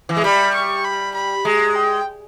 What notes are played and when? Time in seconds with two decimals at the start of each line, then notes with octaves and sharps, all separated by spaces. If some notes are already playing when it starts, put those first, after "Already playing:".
0.09 E3
0.17 G#3
0.24 G3 B5
0.54 C#6
0.85 B5
1.15 B5
1.45 G#3 A#5
1.75 G5